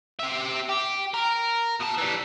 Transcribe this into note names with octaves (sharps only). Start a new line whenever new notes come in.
G4 E5
G4
A#4
B2 A5
E3 G3